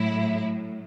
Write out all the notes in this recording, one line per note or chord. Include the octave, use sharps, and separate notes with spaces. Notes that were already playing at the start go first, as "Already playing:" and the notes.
Already playing: A2 F#3 E4